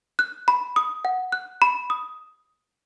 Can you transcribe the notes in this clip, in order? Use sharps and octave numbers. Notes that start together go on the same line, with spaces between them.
F#6
B5
D#6
F#5
F#6
B5
D#6